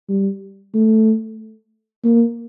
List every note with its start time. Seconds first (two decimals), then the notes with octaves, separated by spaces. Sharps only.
0.09 G3
0.74 A3
2.04 A#3